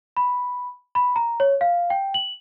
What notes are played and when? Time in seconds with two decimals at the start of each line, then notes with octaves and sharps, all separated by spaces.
0.17 B5
0.95 B5
1.16 A#5
1.40 C#5
1.61 F5
1.90 G5
2.14 F#7